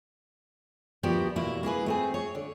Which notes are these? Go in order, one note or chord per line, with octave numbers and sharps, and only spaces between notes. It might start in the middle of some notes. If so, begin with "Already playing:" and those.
D2 F3 B3 G4 A#4 D5
E2 B2 A#3 E4
A#3 E4 G#4 B4
A3 C4 G#4
C#5
D3